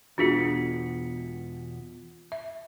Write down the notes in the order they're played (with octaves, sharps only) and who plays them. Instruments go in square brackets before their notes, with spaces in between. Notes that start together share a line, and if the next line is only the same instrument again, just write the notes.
[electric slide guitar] E2 B2 [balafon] D4 F#4 G#4 [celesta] F4 B6 C#7
[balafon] E5